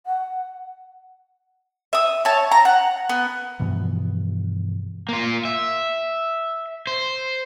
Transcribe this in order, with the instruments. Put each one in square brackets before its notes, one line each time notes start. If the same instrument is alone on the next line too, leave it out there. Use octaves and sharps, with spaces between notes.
[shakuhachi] F#5
[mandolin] E5 D#6
C#5 A5
A#5
F#5
B3
[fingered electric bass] G2 B2 E3 F3
[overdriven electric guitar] A#3 F4
E5
C5